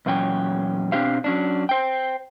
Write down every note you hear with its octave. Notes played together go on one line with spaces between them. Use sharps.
E2 A#2 F#3 C#4 G5
B2 C4 D4 G4 C5 F5
F#3 C#4 D4
C5 G5